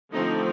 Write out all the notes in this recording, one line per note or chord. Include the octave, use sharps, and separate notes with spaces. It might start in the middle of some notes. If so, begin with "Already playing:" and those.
D3 F3 A3 C4 D#4